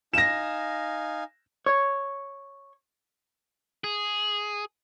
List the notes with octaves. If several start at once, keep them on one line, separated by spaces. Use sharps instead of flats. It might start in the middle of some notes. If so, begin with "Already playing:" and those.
D#4 F5 G#5 A#6 E7
C#5
G#4